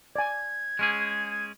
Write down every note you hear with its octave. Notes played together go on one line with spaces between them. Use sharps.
D5 G#5 G#6
G#3 C#4 G#4